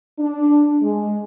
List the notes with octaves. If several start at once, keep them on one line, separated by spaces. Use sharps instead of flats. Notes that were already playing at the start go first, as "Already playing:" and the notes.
D4
G#3